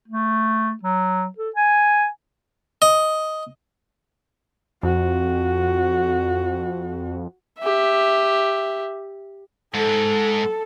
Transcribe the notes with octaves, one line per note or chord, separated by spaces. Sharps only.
A3
F#3
A4
G#5
D#5
F2 F#4
G4 E5
G#2 A4